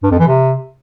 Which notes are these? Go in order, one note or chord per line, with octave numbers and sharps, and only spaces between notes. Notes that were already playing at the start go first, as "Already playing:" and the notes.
G2
F2
E3
C3